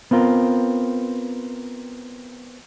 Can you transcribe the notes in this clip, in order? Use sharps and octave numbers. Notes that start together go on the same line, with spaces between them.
B3 C4 F4 A#4